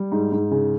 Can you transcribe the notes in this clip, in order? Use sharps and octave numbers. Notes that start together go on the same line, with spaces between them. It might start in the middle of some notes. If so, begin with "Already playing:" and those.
Already playing: G3
G#2
G#2
C#3